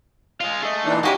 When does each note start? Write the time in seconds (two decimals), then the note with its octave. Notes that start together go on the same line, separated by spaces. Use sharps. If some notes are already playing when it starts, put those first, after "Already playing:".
0.40 G#3 F4 F5
0.63 A3 G#4 D#5
0.85 A#2 E3 D4 D#4
1.03 G#3 A#3 C#4 F#4 G4 B4